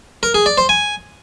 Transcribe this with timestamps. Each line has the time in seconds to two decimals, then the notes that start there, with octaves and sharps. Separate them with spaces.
0.23 A#4
0.34 G#4
0.46 D5
0.58 C5
0.69 G#5